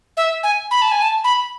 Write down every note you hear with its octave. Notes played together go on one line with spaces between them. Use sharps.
E5
G#5
B5
A5
G#5
A5
B5